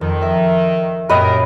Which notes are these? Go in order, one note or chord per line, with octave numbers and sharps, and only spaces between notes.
F2 D#3
A#4 E5
F#2 A#2 G4 G#4 A#4 B4 D#5